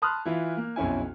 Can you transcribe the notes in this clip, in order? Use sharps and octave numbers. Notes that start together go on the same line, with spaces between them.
A5 B5 C6 D#6 F6 F#6
E3 E4 F4
A#3
B1 F2 C#4 E4 G#5